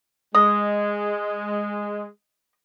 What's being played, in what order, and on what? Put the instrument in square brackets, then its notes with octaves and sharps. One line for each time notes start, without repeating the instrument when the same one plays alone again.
[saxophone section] G#3 [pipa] D#5